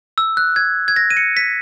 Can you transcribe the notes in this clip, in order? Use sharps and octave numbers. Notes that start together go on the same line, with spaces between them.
E6
F#6
G#6
G#6
A#6
D#7
C#7
B6